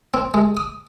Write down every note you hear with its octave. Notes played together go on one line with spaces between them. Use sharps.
C4
G#3
D#6